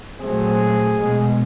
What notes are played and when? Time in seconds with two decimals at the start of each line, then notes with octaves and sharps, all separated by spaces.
0.20 A#2 F#3 A3 C4 G#4
0.94 B2 G#3 B3